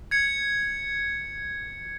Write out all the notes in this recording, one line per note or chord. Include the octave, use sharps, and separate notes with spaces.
G#6 C#7